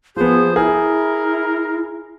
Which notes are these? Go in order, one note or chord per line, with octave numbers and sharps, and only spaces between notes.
F3 B3 G#4 C5
E4 G#4 A#4